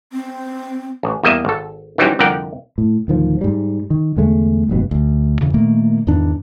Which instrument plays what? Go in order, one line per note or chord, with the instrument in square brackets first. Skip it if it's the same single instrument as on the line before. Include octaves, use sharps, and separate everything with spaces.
[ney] C4
[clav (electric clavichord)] A1
E2 G3 A#3 D#5 E5
G#1 A4
D#3 E3 F#3 G3 C4 C#4
C2 F2 D3 A#4 F#5 G5
[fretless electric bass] A2
D1 D#3 F3
G#2 G3
D#3
E2 D3 G#3 A3
F1 A#1 G2 B2
[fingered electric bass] D2
F2 C#3 E3
A#2 D#3 A3 A#3
E2 G#2 D#3 D4